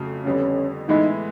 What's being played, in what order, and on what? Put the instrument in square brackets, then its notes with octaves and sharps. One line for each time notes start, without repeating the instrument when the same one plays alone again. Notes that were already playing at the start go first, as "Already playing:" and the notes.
Already playing: [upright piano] F2 C#3 F#3 A3
[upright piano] F2 D3 G3 B3 [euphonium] C#4
[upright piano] A2 E3 G#3 B3 E4 [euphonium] D#4